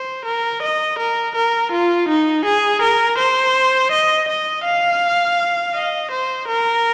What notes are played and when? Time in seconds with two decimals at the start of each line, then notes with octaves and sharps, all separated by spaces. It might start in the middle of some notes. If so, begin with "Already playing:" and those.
Already playing: C5
0.25 A#4
0.63 D#5
0.99 A#4
1.35 A#4
1.72 F4
2.08 D#4
2.45 G#4
2.82 A#4
3.18 C5
3.92 D#5
4.29 D#5
4.65 F5
5.75 D#5
6.11 C5
6.48 A#4